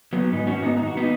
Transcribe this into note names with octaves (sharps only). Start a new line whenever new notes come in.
F#3 B3
G#2 D#3 B3 D#4
C#4 F#4
B3 D#4
D#4
F#4
D#3 B3 D#4